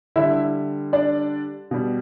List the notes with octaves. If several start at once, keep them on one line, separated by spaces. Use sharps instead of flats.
D3 G3 E4 E5
D4 D5
B2 G3